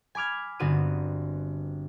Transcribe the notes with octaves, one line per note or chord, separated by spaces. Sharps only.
G#5 B5 D6 F6 G#6
G1 D3 B3 C4 F#4 D#7